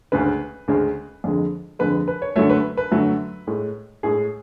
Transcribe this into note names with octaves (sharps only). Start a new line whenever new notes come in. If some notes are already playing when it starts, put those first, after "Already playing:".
D2 C#3 G#3 B4
D2 C#3 G#3
F2 D3 G#3
F2 D3 G#3 B4
B4
C#5
F#2 D3 F#3 A3 C#5
B4
B4
F#2 D3 F#3 A3
A2 G#3
A2 G#3 G#4